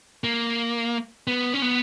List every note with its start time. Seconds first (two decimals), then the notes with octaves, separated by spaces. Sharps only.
0.24 A#3
1.27 B3
1.54 C#4
1.62 B3